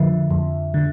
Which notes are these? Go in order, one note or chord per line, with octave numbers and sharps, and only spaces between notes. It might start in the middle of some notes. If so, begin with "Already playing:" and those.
Already playing: F2 D3 F3 E5
F2
D3